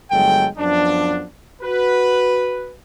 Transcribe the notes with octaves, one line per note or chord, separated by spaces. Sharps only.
G1 F#3 G#3 A4 G5
F#2 F3 B3 D4
F#4 B4